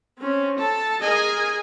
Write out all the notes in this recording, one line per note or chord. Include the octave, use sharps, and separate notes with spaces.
C4 C#4
A4 A5
G#4 A#4 D#5 G#5